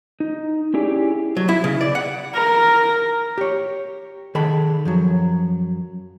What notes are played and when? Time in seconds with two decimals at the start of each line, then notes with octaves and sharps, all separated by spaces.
0.20 D#4
0.74 C#4 E4 G4 G#4 D5 G#5
1.37 F#3
1.49 E4
1.64 C#3
1.81 D5
1.95 F#5
2.34 A#4
3.38 G4 C#5
4.35 D#3 G#4 A4 A5 B5
4.85 F#2 F3 F#3